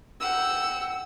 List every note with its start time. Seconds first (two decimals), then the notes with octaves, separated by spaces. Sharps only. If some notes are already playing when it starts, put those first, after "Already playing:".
0.21 F#5 G5 E6